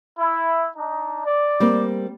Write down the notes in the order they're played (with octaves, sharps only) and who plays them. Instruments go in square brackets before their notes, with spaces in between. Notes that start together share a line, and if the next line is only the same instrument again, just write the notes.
[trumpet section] E4
D4 D#4
D5
[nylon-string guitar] G3 A#3 C4